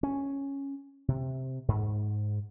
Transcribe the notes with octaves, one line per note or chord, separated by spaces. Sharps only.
C#4
C3
G#2